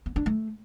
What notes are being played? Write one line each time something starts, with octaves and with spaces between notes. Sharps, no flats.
B3
D4
A3